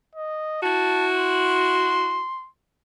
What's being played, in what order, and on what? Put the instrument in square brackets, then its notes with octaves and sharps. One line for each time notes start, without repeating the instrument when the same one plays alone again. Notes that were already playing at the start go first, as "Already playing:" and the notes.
[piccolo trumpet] D#5
[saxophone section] E4 F#4 [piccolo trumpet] A5
[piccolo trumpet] C6